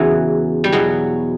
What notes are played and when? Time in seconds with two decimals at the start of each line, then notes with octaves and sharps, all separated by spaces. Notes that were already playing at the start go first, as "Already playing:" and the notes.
Already playing: E2 C#3 E3 F#3
0.64 G3
0.72 E2 B2 F#3